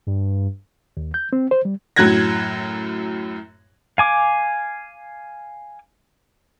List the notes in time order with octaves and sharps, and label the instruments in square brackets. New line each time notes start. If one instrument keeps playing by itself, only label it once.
[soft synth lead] G2
[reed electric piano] D#2
G6
C4
C5
G3
[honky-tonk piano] F#2 A2 F#3 F#6 G#6 A#6
[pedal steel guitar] F5 G#5 D6